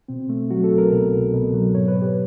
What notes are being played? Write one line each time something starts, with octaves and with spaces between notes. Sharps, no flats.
B2 C4
A3
F#3 F#4
A4
C2
A#4
B2
C2
B2
F#3
G#2 C#5
B4
G#2
G4